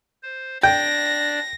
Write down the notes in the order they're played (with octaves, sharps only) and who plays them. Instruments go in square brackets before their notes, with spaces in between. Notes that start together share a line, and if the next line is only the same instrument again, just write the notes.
[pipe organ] C5
[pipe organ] D4 D5 [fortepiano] G5 [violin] A#6